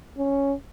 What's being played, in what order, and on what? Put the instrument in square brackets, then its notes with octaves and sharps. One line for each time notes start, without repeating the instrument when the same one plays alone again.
[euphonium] C#4